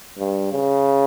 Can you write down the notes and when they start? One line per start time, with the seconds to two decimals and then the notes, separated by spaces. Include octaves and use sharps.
0.19 G2
0.52 C#3